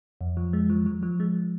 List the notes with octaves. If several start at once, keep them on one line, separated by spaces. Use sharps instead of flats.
F2
F3
G#3
F3
F3
F3
G#3